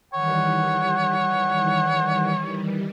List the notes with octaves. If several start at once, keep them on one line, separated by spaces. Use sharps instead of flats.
D#3 E3 G3 C#5 F#5